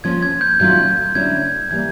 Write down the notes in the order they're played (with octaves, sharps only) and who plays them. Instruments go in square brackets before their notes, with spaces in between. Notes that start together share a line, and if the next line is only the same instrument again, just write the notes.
[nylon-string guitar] F3 A#3 C#4 [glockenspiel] G#6
[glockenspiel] G#6
G6
[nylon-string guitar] D#3 F#3 A3 C#4 F4 [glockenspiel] G6
[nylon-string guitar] D3 F#3 A3 C#4 E4 [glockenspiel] G#6
[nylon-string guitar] E3 G3 A#3 [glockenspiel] G#6